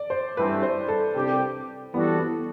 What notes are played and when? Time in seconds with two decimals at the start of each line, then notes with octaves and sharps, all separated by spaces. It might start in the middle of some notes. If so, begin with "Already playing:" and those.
Already playing: D5
0.10 C5
0.37 G2 E3 A3 C4 B4
0.63 C5
0.88 A4
1.15 C2 C3 G3 D4 G4
1.94 E3 G3 B3 D4 F#4 A4
2.20 B3